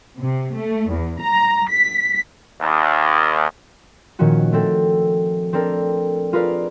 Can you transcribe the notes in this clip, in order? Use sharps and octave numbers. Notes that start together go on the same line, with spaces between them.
C3
A3
E2
A#5
B6
D#2
A#2 D#3 F3 C#4 F#4
A3 C4 A4
C4 D4 A4 A#4
F4 G#4 A#4 B4 D5 F5